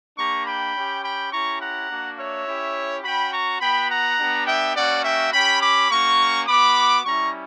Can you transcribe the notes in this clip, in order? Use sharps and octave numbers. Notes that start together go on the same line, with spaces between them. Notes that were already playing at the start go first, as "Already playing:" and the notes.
A#3 D4 G4 A#5 C#6
G5 B5
C#4 G4
G5 B5
C#4 E4 G4 A#5 C#6
F#5 A#5
A#3 D4 F#4
C#5 E5
C#4 E4 G4
C#4 F#4 G5 B5
A#5 C#6
B3 F#4 G5 B5
F#5 A#5
B3 D4 G4
E5 G5
A#3 C#4 F#4 D5 F#5
E5 G5
C#4 G4 G5 B5
B5 D6
A#3 C#4 F#4 A#5 C#6
B3 F#4 B5 D6
G3 C#4 E4 A#5 C#6